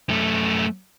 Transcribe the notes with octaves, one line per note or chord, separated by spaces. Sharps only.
F#2 A3